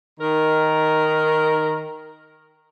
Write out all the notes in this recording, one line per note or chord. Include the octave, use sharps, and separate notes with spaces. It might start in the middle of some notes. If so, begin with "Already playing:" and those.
D#3 A#4